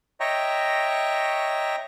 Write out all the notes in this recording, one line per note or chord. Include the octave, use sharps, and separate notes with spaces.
C#5 D#5 E5 G5 A#5 C#6